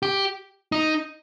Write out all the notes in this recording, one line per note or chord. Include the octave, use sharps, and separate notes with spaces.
G4
D#4